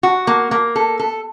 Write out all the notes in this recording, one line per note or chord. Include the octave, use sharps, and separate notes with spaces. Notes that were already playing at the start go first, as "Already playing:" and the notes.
F#4
A#3
A#3
A4
A4